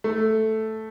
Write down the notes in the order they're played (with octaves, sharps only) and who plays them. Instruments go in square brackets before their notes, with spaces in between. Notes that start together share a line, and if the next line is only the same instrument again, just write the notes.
[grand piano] A3